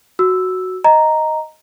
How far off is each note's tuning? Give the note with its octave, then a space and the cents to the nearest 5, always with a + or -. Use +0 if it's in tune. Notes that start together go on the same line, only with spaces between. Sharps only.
F#4 +0 E6 +0
D#5 +0 A#5 +0